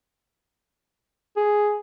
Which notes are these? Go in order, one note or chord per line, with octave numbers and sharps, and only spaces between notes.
G#4